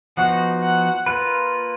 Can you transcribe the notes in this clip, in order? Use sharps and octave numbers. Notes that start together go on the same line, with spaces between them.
F3 B3 D#4 F#4 F#5
F#5
A#3 F4 B4